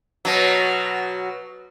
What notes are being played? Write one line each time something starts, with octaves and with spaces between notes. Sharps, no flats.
B2 F#3